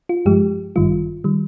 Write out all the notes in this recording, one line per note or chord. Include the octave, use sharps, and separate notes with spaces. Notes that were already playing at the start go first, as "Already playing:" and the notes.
F4
G2 F3 G#3 G4
G#1 G2 D#3 G3 F4
D#3 G3